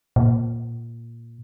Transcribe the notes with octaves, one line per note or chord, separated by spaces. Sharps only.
A#2